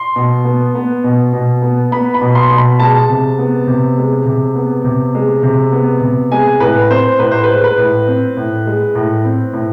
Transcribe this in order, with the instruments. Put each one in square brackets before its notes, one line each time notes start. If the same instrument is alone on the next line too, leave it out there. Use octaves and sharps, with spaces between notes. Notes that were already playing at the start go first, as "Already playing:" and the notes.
Already playing: [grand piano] C6
B2
B3
B3
B2
B2
B3
B3 B5
B5
B2
C6
B2
B5
G#3 A5
C3
B3
C3
G#3
C3
B3
C3
G#3
C3
B3
C3
G#3 G#5
A2 B4
C4 C5
A2 B4
C5
B4
G#3
B4
A2
C4
A2
G#3
A2
C4
A2